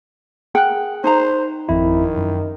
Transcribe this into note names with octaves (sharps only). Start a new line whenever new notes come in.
G#4 A#4 F#5 G5 F#6
D#4 C5 A#5
G#1 F2 D#3 E4
F#2